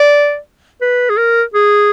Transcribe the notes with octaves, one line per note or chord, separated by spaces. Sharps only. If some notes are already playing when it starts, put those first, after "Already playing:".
Already playing: D5
B4
G#4
A#4
G#4